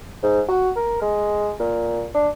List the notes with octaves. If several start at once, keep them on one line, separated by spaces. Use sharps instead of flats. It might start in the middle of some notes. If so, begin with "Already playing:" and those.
G#2
F#4
A#4
G#3
A#2
D4